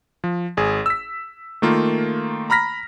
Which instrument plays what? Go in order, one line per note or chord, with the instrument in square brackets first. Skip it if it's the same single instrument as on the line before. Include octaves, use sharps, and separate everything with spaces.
[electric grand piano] F3
G#1 G#4
E6 B6
D#3 A3 A#3 F4
A#5 B5 F6 A#6 B6